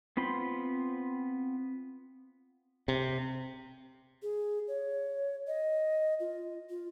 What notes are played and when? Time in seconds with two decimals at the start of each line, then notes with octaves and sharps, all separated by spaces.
0.17 B3 C4 F4 B5 C6
2.88 C3
4.22 G#4
4.68 C#5
5.47 D#5
6.20 F4
6.70 F4